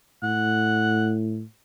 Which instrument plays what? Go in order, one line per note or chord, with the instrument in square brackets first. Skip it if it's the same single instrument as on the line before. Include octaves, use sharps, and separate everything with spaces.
[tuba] A2 [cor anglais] F#5